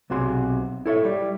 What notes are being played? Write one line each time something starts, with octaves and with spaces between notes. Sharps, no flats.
B1 C3 F#4 G#4 C6
E4 A4 C#5 E5
G3